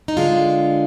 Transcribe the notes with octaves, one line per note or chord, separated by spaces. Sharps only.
D#4
D3 G#3 D4 F4